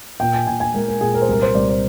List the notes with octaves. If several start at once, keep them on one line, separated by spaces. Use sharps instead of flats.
A#2 G5
G#5
A#2 G#5
G#5
G#3 A#4
A#4
A#2 G#4
A#4
C5
C2 A#4
C5
C2 D5
C5